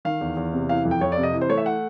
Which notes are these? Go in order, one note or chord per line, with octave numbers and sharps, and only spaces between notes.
D#3 F5
E2
E2
C3
E3 F5
F2
G5
F2 C#5
D5
C3
D#5
E3
C5
A3 C#5
E5
F#5